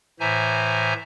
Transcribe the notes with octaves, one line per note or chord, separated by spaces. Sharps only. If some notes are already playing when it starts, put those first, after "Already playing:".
A2 E3 C5 E5 G#5 A#5